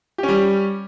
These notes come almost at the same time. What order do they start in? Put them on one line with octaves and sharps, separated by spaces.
G4 C#4 G3